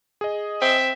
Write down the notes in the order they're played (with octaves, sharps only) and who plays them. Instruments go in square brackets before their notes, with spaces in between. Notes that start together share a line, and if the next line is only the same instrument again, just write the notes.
[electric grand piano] G#4 D#5
[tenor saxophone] C4 [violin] E5 E7